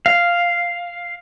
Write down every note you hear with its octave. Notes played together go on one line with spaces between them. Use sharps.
F5